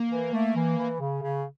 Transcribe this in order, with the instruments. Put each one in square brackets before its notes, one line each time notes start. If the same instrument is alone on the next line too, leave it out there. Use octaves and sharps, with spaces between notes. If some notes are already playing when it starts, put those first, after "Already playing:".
Already playing: [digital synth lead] A#3
[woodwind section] E3
A3
E3
E3
C#3
C#3